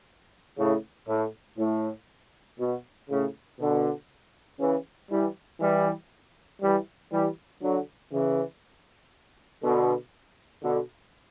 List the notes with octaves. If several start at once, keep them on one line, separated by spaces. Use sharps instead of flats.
A2 C#3
A2
A2
B2
A2 C#3
B2 D3
C#3 E3
E3 G3
E3 G3
E3 G3
E3 G3
D3 F#3
C#3 E3
B2 D3
B2 D3